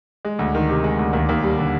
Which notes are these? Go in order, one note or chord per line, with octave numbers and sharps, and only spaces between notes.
G#3
D2
D#3
C3
G#3
D2
D#2
D#2
G3
D3